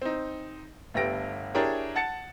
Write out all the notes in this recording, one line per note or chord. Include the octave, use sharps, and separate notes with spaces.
C4 D#4
G1 A3 B3 G4 A#6 D7
D4 E4 G4 G#4 A#4 C#5
F#5 A5 A6 C#7